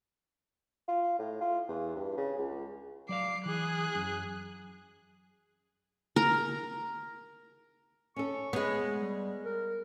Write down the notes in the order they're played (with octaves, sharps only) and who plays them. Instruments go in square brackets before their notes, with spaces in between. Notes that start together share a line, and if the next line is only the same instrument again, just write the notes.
[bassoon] F4
A2
F4
E2
G2
C#3
C#2
[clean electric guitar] F#3 D5 F5 [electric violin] D6 C7
[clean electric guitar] E3 [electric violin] G#4 F#6
[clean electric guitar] F#2
[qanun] A#4
[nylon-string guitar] C#4 A4 [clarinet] C#6
[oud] G#3 B3 [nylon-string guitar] C#5
[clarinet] G3
A#4